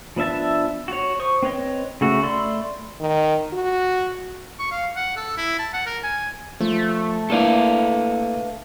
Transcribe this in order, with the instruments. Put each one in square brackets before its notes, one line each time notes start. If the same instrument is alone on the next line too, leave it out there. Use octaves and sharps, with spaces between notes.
[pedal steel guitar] F3 B3 D4 E5 A5
F#4 C#5
C5 C#6 D#6
C4 B4 C#5 D#5
C#3 A3 F#4
A3 D5 B5 C6 E6
[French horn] D#3
F#4
[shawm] C#6
F5
F#5
A4
E4
A5
F#5
A#4
G#5
[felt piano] F3 [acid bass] A3
[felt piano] A#3 D4 E4 [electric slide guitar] A4 B4 F5